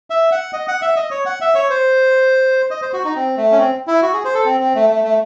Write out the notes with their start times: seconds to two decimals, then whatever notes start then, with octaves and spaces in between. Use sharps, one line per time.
0.10 E5
0.32 F#5
0.53 D#5
0.68 F#5
0.82 E5
0.96 D#5
1.11 C#5
1.26 F#5
1.41 E5
1.55 C#5
1.70 C5
2.71 D#5
2.82 C5
2.93 F#4
3.05 D#4
3.16 C4
3.37 A3
3.52 C#4
3.58 C4
3.87 E4
4.02 F#4
4.13 G#4
4.25 C5
4.34 A4
4.46 C4
4.60 C4
4.75 A3
4.90 A3
5.04 A3